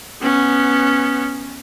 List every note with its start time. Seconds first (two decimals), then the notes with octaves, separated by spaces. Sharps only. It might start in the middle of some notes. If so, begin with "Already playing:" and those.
0.22 B3 C#4